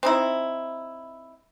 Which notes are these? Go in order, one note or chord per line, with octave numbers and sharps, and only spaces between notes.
C4 D#4 E4